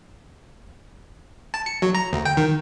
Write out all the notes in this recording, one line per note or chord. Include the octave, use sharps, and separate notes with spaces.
A5
C#7
F#3
A#5
D2
G5
D#3